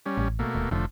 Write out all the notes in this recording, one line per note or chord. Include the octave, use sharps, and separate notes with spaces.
G3 C#4
A1
B2 A3 A#3
D#1
F1 D3 F3 A3